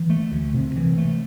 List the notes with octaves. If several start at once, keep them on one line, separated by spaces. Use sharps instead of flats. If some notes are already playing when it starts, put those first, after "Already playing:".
Already playing: E3
A3
D2
C3
E3
A3